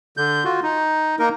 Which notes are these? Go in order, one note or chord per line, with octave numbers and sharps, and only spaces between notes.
D3 G6
F4 F#4
D#4
A#3 D#4 A#4